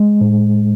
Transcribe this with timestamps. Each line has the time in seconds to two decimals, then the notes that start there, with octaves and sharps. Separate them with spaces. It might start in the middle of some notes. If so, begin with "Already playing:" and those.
Already playing: G#3
0.21 A2